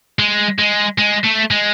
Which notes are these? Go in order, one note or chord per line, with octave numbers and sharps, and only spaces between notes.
G#3
G#3
G#3
A3
G#3